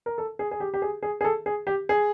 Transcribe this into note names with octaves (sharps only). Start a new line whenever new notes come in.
A#4
A4
G#4
G#4
G4
G4
G#4
G#4
G#4
A4
G#4
G4
G#4